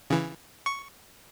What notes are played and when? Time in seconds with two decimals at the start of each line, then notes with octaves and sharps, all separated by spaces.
0.10 C#3 E3
0.66 C#6